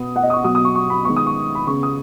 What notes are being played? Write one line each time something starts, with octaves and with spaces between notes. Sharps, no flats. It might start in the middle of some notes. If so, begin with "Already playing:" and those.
Already playing: B2 B3 D#6
F#5
D#5
D#6
C#6
B2 F#3 B3 D#6
D#6
C#6
C#6
B5
D#3 G#3 B3 C#6
D#6
C#6
B5
C#3 B3 C#6
D#6